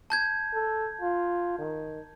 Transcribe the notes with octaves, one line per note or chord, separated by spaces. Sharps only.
A5 G6 G#6
A4
F4
D#3